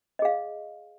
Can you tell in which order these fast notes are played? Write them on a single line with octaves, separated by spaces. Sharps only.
D#5 G#4 F5